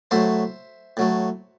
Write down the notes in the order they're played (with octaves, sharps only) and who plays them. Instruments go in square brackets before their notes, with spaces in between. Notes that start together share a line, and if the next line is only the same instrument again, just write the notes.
[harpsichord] A2 F#3 A3 C5 E5
A2 F#3 A3